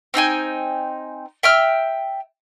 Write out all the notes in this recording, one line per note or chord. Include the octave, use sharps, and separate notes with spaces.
C4 D#4 G5 G#5
E5 G5 E6 F6